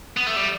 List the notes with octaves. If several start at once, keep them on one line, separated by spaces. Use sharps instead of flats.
B3
A3
G3